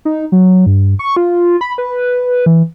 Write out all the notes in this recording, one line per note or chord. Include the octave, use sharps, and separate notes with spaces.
D#4
F#3
G2
C#6
F4
B5
B4
E3